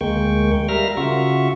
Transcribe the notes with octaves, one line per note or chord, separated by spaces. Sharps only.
D2 G#3 A#3 G5 C#6
G3 A#4 E5 F5 F6 A#6
C#3 F4 F#4 E5 C#6